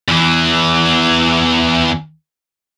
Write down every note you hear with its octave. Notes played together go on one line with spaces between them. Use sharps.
E2 E3